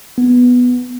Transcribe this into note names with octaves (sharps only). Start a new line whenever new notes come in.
B3